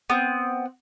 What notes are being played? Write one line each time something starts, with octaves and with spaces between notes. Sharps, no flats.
B3 C4